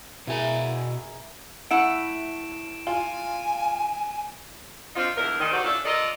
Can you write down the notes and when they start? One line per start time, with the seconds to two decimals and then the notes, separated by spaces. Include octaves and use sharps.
0.27 B2 E4 G#4 A#4 G#5
1.71 A3 E4 F#5 D7 E7
2.87 F4 G#5
4.96 C4 D4 D#4 F4
5.16 E2 D3 E3 D4 A#4
5.39 A#2 D#3
5.52 D#4 F#4 G4 A4 C5 D5
5.64 A3 C#4 D4 E4 F4 A4
5.85 F4 A4 A#4 D5 D#5